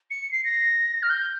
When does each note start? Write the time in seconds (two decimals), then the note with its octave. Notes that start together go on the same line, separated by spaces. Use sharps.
0.10 C#7
0.31 C7
0.44 A#6
1.02 F6
1.09 G6